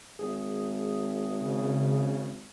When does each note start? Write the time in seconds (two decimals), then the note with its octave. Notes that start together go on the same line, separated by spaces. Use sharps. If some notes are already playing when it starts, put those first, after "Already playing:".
0.19 G#1 G#4
1.42 C#3